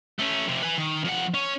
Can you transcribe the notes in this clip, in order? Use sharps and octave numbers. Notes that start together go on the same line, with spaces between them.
A3 C#4
F2 C3
B4 G#5
D#3
F2 F#5
C#4